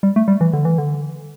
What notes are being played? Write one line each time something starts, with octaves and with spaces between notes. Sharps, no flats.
G3
A3
G3
E3
D3
E3
D3